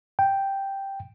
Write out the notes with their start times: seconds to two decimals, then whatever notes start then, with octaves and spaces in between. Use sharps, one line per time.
0.19 G5